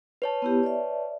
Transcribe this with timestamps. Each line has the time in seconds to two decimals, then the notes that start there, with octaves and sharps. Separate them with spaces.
0.22 B4 C#5 A5
0.42 B3 E4 G4
0.63 D5 E5